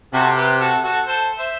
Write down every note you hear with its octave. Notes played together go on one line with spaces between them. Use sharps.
C3 F#4 A4
G4 B4
F#4 A4
F#4 A4
A4 C5
C5 E5